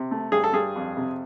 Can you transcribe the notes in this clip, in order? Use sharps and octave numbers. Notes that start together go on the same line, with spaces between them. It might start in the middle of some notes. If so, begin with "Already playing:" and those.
Already playing: C3
A3
G2 G#4
A4
G2 G#4
F2
C3